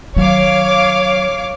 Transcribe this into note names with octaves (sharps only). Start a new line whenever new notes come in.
D#3 F#3 C#5 F5 D6